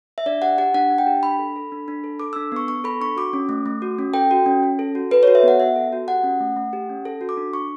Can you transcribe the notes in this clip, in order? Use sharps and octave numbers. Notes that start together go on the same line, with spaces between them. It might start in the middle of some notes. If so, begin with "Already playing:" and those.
E5
D4 D5
G4 F#5
G4 F#5
D4 F#5
D4
G5
G4
D4 B5
A4
A4
D4
D4
A4
A4 D6
D4 E6
B3 C#6
B3 C#6
A4 B5
D4 C#6
F#4 D6
C#4
A3
A3
F#4
C#4
A4 G5
F#4
C#4
C#4
A4
F#4
A4 B4
F#4 C#5
E5
B3 F#5
B3 E5
A4
F#4
G4 F#5
C#4
A3
A3
G4
C#4
A4
F#4
D6
D4
D4 C#6